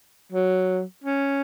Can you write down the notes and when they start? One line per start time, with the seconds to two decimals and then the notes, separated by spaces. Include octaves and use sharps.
0.32 F#3
1.04 C#4